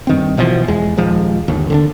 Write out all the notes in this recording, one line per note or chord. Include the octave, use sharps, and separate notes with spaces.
G2 D#3 C4
B1 B2 E3 F3
E2 G#3
D#1 F3 G#3
G1 D#2
D3 C4 D4